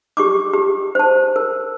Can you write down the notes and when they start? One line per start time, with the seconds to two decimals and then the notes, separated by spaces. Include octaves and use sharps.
0.17 G4 C#6 D6
0.53 G4
0.95 C5 A5
1.36 A#4